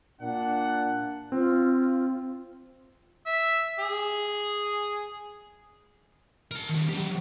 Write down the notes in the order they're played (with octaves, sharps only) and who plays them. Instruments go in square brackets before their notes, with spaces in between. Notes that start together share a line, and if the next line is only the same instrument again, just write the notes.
[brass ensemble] A#2 D4 F#5
[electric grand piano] C4 [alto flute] F4
[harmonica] E5
G#4
[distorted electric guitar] A#4 A5
D#3 G3
F#3 G4